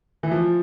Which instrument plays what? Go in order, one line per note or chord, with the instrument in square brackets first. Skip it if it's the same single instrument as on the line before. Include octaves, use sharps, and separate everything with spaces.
[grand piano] E3
F3